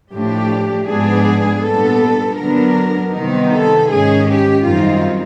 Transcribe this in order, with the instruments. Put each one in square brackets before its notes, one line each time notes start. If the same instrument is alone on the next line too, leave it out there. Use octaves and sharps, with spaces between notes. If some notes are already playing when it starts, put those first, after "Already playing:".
[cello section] A2 F3 A3 D4 G4
G#2 F3 G#3 B3 D4 G#4
A#2 G3 B3 D4 A4
D3 F#3 B3 D4 A#4
C3 D#3 G3 B3 D#4
A4
G#2 D#3 G#3 C#4 G#4
G4
F#2 D#3 G3 C4 D#4 F4